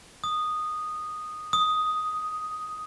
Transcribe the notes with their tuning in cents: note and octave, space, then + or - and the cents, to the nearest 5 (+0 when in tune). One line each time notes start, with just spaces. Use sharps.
D#6 -10
D#6 +5